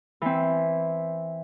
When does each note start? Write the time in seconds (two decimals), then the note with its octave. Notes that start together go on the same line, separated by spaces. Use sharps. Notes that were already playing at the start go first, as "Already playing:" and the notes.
0.22 E3 C4